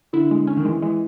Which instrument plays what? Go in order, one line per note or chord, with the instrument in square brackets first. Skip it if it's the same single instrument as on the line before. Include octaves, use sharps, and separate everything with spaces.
[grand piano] D3 [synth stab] E4
[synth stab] G#3
C#4
[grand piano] D#3
[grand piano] E3 [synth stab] G#3
[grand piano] E3 [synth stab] G#3